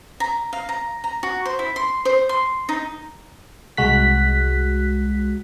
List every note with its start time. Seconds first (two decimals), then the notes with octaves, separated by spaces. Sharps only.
0.20 A#5
0.53 F5
0.69 A#5
1.04 A#5
1.23 F#4
1.46 C5
1.59 E4
1.76 C6
2.05 C5
2.29 C6
2.69 D#4
3.77 C2 G#3 F#4 F#6 B6